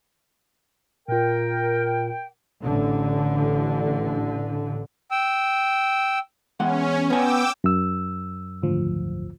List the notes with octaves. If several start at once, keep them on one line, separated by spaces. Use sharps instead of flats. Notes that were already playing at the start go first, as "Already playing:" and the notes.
A#2 F4 A#4 G5
A1 D3
G5 E6
E2 G#3 C#4 F#5
B3 G5 G#5 D6 E6
F#2 E6
G#1 D2 F3